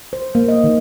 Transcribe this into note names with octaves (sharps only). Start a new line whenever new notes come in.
C5
A#3
D#5
D#3